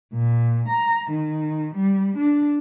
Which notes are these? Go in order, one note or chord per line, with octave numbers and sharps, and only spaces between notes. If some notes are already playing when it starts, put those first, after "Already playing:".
A#2
A#5
D#3
G3
D4